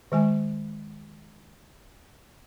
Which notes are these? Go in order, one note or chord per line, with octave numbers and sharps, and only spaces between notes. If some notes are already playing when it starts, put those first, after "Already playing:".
D#3 G#3 G#5